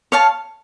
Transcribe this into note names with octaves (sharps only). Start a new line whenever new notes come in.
C#5 F5 A5